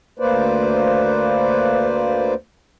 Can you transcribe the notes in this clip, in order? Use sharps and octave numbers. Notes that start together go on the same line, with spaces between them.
D2 A#3 B4 C5 D5